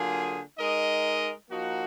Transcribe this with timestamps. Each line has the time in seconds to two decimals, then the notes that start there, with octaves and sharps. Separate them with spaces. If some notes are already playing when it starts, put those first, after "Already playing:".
Already playing: D3 F#3 A#3 F4 G#4
0.59 G#3 D#4 A#4 D#5
1.50 F3 A#3 D#4 F#4